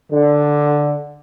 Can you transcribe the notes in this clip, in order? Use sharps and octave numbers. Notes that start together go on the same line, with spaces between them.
D3